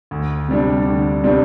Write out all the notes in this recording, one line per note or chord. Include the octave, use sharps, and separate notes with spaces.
D2
C3 G3 D4
D2
C3 G3 D4